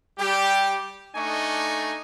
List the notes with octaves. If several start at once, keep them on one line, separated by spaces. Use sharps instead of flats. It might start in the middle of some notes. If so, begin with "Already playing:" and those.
G3 G4
A3 D4 D#4 D#5 G#5 C#6